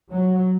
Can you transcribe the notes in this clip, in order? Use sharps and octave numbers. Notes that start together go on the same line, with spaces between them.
F#3